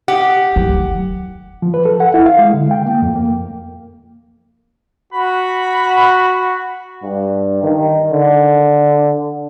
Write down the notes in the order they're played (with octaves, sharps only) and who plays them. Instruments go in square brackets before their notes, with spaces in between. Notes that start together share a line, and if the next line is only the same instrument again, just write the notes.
[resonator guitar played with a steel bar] G4 [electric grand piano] F#5
[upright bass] D#3 F#3
[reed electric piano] F3
B4
A4
F#5
E4
F5
G#3
D3
G5
A#3
F2
A#3
[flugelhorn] F#4 [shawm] B5
[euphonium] G2
D#3
D3